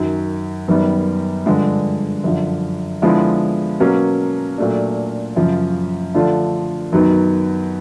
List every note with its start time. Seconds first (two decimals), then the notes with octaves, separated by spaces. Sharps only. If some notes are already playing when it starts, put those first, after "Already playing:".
Already playing: F#2 D#3 F#3
0.68 F#2 D#3 G3 B3
1.46 G2 D3 F3 G#3
2.24 F#2 D3 F3
3.02 D3 F3 G#3 B3 E4
3.80 B2 F#3 A#3 C#4
4.58 A#2 F#3 A3 D4
5.36 F#2 C#3 F3
6.14 D3 F3 A3 D4 F4
6.92 F#2 D#3 F#3 B3 D#4